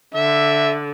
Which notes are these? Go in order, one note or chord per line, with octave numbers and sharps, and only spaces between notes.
D3 E5